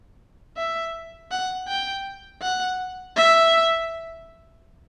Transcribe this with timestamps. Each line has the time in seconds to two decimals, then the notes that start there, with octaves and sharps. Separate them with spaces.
0.57 E5
1.31 F#5
1.68 G5
2.42 F#5
3.16 E5